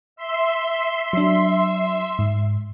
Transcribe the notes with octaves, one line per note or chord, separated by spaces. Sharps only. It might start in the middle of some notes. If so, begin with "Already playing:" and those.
E5 C6
F#3 D4
G#2